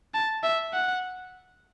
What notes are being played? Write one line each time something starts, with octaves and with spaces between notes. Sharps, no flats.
A5
E5
F#5